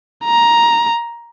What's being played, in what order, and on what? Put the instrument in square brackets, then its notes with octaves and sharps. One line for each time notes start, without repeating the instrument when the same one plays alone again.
[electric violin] A#5